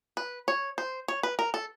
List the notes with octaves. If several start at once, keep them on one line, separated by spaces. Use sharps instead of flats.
B4
C#5
C5
C#5
B4
A#4
A4